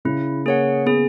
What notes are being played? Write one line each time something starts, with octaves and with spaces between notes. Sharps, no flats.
C#3 E4
A#3 G#4 C#5 F#5
B3 G#4